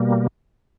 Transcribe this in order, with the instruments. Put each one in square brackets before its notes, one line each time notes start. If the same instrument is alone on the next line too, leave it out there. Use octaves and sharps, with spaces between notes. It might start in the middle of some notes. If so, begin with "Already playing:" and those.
Already playing: [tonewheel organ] B2 G3 A#3